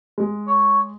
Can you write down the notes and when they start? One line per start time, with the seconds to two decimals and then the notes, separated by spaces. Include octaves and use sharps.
0.18 G#3
0.47 C#5